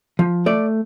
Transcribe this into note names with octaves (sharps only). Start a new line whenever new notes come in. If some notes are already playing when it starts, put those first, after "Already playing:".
F3
A3 D5